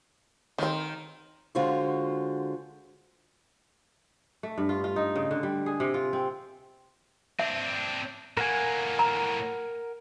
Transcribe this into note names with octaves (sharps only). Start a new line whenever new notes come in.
D#3 C4 D#4
D3 G#3 F4 F#4 C5 C#5
A3
G2
F4
F4
D#4
C#3
D3
G3
G#4
C3
F4
C4
C4 D4 E5
A2 A#3 A#4 F#5 G#5
A#5